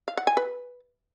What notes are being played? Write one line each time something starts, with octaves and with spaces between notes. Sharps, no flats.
F5
F#5
G#5
B4